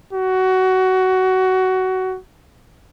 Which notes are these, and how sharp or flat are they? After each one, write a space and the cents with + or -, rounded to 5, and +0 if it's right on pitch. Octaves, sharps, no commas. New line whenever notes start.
F#4 +20